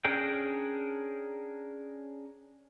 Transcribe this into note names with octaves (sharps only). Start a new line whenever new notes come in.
C#4 D4 G#4 A#4 G5